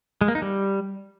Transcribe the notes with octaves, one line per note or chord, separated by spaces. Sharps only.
G#3
A#3
D#4
G3